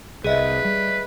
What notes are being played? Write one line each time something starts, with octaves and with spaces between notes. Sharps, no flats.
C2 G#4 B4 D#5 E5
G3